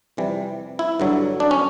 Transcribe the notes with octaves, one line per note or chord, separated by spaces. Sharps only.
F2 C3 E3 G3
E4
G2 D3 F#3
D4
C#4